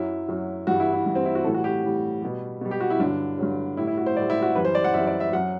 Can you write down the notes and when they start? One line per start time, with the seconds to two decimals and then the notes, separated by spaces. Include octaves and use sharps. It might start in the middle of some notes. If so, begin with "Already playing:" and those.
Already playing: F#2 F#3 E4
0.29 F#2 F#3
0.67 G2 E3 G3 F#4
0.80 E4
0.93 E4
1.06 G2 E3 G3
1.15 C4
1.25 E4
1.35 F#4
1.44 A2 E3 G3 A4
1.54 F#4
1.64 G4
1.84 A2 E3 G3
2.22 B2 G3
2.61 B2 G3
2.71 G4
2.80 F#4
2.90 E4
3.00 G2 D3 F#3 D4
3.38 G2 D3 F#3
3.77 A2 G3 E4
3.87 E4
3.97 F#4
4.06 C5
4.17 A2 G3 D5
4.30 E4
4.42 F#4
4.55 F#2 E3 G3 B4
4.65 C5
4.75 D5
4.84 F#5
4.94 F#2 E3 G3 E5
5.07 D5
5.20 E5
5.33 F#2 F#3 F#5